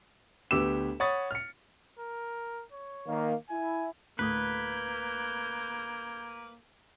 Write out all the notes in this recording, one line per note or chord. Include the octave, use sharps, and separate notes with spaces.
D2 B3 G4 D6 E6 E7
C#5 F#5 B5 C#6 D#6 A6
F6 C#7
A#4
C#5
D#3 A#3
E4 G#5
D2 A2 A#3 B4 D#6 G6 G#6